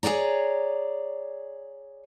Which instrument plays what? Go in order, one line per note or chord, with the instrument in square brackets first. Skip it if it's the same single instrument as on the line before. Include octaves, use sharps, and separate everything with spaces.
[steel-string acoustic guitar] G#4 A#4 C#5 D5 A#5